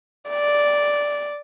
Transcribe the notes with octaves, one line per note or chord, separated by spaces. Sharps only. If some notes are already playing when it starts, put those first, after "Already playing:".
D5